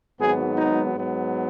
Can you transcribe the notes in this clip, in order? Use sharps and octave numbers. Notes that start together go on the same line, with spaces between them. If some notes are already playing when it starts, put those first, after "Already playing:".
G#1 G#2 F#3 B3 G#4
D#4
G#2 F#3 B3